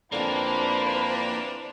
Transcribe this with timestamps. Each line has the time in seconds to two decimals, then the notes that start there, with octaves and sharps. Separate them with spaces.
0.12 F2 D3 E3 A#3 D4 C5 B5